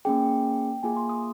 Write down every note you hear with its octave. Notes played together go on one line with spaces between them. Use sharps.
A#3 C#4 G#4 G5
A#3 F4 G#4 G#5
C6
D#6